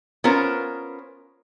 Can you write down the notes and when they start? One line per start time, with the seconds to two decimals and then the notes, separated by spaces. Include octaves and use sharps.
0.24 B3 C#4 F4 A#4 C5